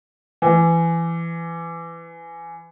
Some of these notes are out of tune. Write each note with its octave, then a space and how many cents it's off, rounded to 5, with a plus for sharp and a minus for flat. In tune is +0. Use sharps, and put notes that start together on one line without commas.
E3 +20